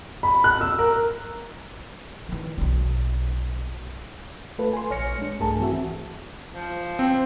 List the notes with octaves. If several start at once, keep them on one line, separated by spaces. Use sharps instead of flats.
B5
F#6
E6
A#4
D#3 E3
B1 D4
A3 F4 A4 B4
G#5 C6
A#1 C#5 F6 A#6 C#7
G#3 D4
B1 G2 A3 G#4 A#4 A5
E3 C4 F#4 E5
F3
C4